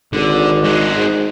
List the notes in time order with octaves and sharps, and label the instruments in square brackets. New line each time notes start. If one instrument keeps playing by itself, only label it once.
[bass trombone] G#1 [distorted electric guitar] D3
[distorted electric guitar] G#3 F#4
[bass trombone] G#2